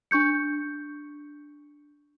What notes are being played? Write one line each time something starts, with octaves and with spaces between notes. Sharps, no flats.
D4 C#6 G6 C#7